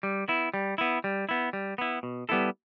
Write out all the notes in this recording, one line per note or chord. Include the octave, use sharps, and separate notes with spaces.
G3
B3 E4
G3
B3 E4
G3
B3 E4
G3
B3 E4
B2
G3 B3 E4 A4